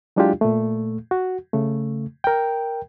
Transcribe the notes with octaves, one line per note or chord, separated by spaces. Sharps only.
F#3 G#3 D4 E4 F4 G4
A#2 A3
F#4
C#3 A3
A#4 G5